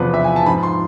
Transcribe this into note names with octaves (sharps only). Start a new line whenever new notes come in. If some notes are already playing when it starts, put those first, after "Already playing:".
Already playing: E2 C3 F3 B4
E5
G#5
A5
G#2 F3 B5
C6